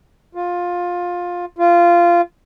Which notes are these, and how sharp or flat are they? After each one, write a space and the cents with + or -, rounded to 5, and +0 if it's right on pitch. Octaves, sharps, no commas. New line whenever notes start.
F4 +15
F4 -15